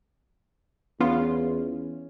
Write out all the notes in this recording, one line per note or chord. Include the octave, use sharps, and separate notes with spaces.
E2 B3 C#4 F4